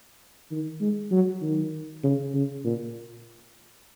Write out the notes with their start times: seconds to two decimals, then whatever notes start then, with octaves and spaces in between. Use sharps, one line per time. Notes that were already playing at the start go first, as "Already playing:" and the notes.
0.51 D#3
0.80 G#3
1.11 F#3
1.42 D#3
2.04 C#3
2.34 C#3
2.64 A#2